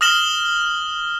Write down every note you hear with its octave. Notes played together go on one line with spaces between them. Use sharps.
D#6 F6 A#6 E7 F#7 G7